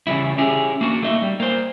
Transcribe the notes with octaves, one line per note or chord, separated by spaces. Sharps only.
C#3 E3 G3 E4
C#4 E4 G4 G#4
A#3 D4 F#4
A3 A#3 D#4 D#5 E5
G3
A#3 C5